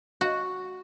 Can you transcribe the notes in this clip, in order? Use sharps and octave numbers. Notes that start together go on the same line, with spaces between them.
F#4